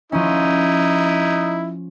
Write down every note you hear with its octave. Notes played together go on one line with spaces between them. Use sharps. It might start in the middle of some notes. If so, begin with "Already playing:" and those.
F3 C#4 D#4 E4